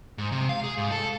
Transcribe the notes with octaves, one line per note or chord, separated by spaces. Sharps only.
G#2
C3
F5
G#4
G#2
A4